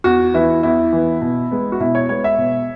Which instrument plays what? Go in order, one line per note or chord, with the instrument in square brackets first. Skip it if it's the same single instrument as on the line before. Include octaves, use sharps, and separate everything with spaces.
[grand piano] E2 F#4
E3 B3 E4
E2 E4
E3 B3
B2
G#3 B3
F#4
B2 E4
C#5
G#3 B3 C#5
E5
B2